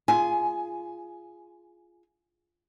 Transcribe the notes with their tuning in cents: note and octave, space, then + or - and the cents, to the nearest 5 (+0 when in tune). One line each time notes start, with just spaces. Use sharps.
F4 -15 G#4 +0 G#5 +15